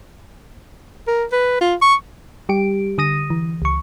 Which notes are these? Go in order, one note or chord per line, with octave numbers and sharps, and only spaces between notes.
A#4
B4
F4
C#6
G3 G4 D7
D3 D#6 A#6 D#7
E3
C#2 C#6